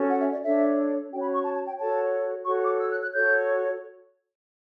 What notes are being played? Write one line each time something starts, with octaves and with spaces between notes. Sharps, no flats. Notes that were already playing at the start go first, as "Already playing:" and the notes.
Already playing: C#4 F#4 A4
F#5
E5
D5
D4 A4 C#5 E5
C#4 F#4 C#5 G5
B5
C#6
A5
A5
G5
F#4 A4 C#5 A5
F#4 A4 C#5 C#6
D6
E6
F#6
F#6
F#4 A4 C#5 G6